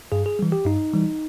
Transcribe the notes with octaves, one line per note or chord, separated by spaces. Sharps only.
G2 G#4
G#4
E3 G3
G4
G2 D#4
E3 G3